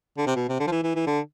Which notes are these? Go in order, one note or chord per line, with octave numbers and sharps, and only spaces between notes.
D3
C3
B2
C3
D3
F3
E3
E3
E3
D3